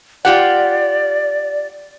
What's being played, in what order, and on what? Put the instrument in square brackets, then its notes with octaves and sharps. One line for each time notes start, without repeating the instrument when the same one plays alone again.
[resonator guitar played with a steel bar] F4 G4 F#5 [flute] D5